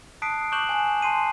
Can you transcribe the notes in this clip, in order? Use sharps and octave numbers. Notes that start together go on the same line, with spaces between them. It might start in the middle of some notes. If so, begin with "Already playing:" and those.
A5 D#6 F#6 B6 C7 D7
C#6 D6 F#6 G6 E7 F#7
G#5
A5 C6 C7 D#7